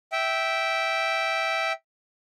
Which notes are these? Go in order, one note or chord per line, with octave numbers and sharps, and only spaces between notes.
E5 G5